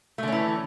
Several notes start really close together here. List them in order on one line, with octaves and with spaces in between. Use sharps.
A3 D3 C#4 E3